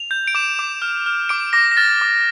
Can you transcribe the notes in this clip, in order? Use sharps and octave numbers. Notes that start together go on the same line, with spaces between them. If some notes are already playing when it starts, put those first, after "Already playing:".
Already playing: F7
G6
D7
D6 E7
D6
F6
F6
D6 D7
D6 A#6
A#6
F6 A6
D6